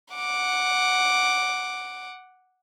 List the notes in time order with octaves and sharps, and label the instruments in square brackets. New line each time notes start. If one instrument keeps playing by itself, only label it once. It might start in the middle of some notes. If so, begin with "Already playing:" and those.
[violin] F#5 D6